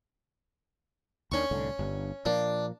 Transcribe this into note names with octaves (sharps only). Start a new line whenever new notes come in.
D#2 D#3 C#4 D4 C#6
C2 A2 D3
G1 G2
A#2 F3 A#3 D4